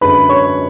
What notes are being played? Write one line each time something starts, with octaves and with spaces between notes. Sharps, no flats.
F#2 D3 G#3 B4 B5
C#5 C#6